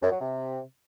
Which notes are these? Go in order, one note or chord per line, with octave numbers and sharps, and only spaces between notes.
F#2
F#3
C3